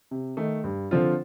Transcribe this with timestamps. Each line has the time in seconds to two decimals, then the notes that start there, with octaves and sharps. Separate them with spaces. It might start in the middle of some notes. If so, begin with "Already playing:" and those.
0.11 C3
0.37 D#3 A3
0.64 G2
0.91 D3 F3 C4 F4